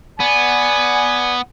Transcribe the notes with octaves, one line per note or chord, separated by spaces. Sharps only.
B3 D5 F#5 G#5